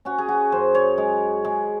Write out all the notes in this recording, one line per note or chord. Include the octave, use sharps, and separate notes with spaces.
C#4 F#4
G#4
F#4
F#2 C5
C#5
G#3
G#3